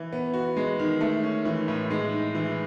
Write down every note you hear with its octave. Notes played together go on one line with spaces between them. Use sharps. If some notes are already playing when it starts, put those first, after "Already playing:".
Already playing: E3
B3
F#4
G#3
D#3
A3
C#4
E3
A2
G#3
D#4
E3